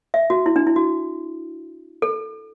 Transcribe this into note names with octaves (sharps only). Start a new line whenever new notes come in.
E5
F#4
E4
D4
E4
F#4
A4